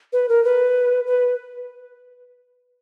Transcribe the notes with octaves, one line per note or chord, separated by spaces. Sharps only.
B4
A#4
B4
B4